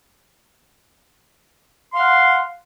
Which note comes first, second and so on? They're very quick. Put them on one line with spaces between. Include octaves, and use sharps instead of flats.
C6 F5 F#5